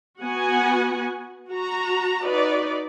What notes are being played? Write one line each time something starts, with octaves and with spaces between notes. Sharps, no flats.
B3 F#4 F#5 G#5
F#4 A#5
D#4 F#4 B4 D5